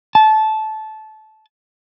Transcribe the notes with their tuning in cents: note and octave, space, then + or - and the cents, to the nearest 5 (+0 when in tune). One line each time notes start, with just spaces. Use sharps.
A5 -20